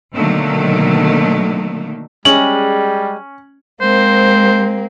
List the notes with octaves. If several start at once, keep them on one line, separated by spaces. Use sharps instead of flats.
B2 D3 D#3 F#3 A3 A#3
G3 G#3 C#4 F#7
G#3 A#3 C4 C5